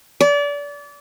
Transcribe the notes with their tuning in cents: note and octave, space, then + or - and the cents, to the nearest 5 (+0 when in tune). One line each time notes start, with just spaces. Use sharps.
D5 -30